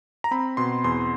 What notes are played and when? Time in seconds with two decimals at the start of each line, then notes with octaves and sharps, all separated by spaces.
0.24 A#5
0.31 C4 B5
0.57 B2 C6
0.84 E2 C6